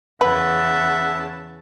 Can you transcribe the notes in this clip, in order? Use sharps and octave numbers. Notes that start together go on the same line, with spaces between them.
E2 C#3 B4 E5 F#5 A5